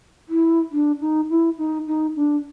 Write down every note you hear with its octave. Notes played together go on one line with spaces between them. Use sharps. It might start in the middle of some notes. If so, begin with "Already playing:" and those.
E4
D4
D#4
E4
D#4
D#4
D4